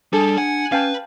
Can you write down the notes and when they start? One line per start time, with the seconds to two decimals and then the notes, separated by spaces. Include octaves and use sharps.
0.13 G3 D4 G#4 A4
0.38 F#5 G#5
0.72 C#4 B4 F5 G5 A5